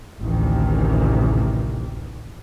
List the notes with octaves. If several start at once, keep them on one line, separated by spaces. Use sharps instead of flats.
A1 D2 C3 D#3 E3